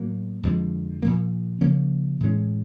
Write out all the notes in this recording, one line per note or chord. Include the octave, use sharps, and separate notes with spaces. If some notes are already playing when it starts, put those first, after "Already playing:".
Already playing: A2 F#3 A#3
F2 D3 F3 G#3
A#2 F3 A#3
C#3 F3 A#3 C#4
A2 E3 G#3 C#4